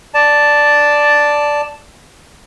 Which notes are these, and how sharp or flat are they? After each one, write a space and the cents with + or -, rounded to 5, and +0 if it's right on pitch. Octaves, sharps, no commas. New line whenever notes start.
D5 +0 A5 +0